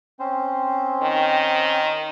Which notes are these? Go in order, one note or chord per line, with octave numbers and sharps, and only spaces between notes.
C4 C#4 C5
D#3